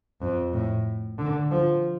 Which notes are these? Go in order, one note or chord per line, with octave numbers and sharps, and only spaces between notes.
F2
A2
D3
F3